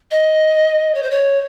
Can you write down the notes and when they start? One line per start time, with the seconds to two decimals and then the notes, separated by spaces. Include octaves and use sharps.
0.11 D#5
0.95 C#5
1.03 C5
1.11 C#5